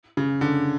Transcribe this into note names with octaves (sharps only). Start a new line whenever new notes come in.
C#3
D3